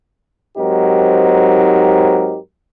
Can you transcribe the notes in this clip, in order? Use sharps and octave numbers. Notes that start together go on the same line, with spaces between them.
G#2 F#3 C4 D#4 G4 A#4